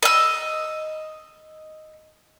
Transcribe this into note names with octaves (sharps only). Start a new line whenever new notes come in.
D#5 E6